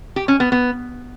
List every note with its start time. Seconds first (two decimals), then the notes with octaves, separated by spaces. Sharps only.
0.16 G4
0.28 C#4
0.40 B3
0.52 B3